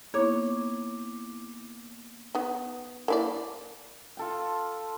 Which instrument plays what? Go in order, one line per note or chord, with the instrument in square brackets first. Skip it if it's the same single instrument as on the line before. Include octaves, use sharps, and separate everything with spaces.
[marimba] A#3 B3 D#4 [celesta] E4 D6 [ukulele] C#5
[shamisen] B3 D#4
A#3 E4 D5
[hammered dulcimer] F4 A4 G5